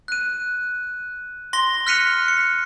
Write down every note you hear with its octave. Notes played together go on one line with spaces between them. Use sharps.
F#6 D#7
C6 A#6 G7
F6 F#6 B6 C#7 D#7 F7
C#7